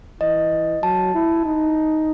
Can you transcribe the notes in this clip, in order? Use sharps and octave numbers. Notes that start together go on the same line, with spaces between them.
E3 D#5
F#3 A5
E4
D#4